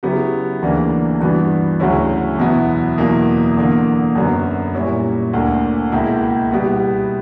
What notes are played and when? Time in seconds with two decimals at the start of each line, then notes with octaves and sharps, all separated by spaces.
0.03 C#3 F#3 B3 E4 G4
0.62 D2 C#3 E3 A#3 D4
1.21 G2 E3 B3 D4 F#4
1.80 D2 C#3 F#3 C#4 E4
2.38 E2 B2 F#3 B3 E4
2.98 E2 B2 F#3 A#3 E4
3.57 E2 D3 A#3
4.15 F#2 D3 F#3 B3
4.74 A#2 G3 C#4 E4
5.33 D2 D3 A#3
5.92 C#2 B2 A#3 E4
6.51 B2 G3 B3 E4